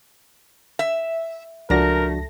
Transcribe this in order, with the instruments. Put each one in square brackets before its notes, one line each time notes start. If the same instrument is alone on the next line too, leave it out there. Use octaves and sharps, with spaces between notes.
[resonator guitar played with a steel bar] E5
[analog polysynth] C#2 A5 A#6 [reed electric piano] F3 D4 F#4 [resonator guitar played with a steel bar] A3 [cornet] A#4